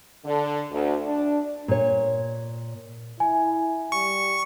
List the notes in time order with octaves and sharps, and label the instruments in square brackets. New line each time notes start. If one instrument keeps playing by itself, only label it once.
[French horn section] D3
D2
D4
[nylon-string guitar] A#2 C#5
[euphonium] E4 [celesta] G#5
[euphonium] G3 [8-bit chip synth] C#6